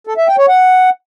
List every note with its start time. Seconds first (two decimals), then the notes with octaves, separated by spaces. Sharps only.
0.07 A4
0.17 E5
0.28 G5
0.38 C#5
0.49 F#5